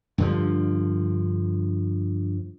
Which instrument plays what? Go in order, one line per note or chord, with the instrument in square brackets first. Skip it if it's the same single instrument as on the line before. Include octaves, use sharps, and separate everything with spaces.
[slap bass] G2 D3 F3